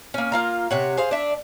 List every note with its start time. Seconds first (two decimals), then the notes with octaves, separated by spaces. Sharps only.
0.14 A#3 C#4
0.32 A#3 F4 A#5
0.71 C3 C#5 F#5
0.97 G#4 C5 F5
1.11 D4 E5